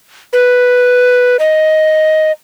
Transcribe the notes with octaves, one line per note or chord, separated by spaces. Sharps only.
B4
D#5